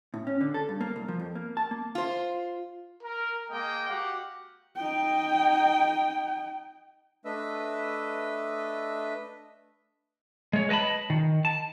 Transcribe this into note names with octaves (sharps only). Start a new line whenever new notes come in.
A2
C#4
D3
A4
G2
A#3
C2
F3
F2
A#3
A5
A#3
F4 C5
A#4
G#3 A#3 D#5 G5
F#4 G4 F5 F#5
D#4 G5
A3 D4 B4 D#5 E5 E6
G#3 C#5
B4 D#5 G#5 A5 B5
D#3
A5